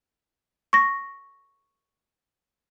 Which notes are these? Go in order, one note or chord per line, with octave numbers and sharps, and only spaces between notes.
C#6 A#6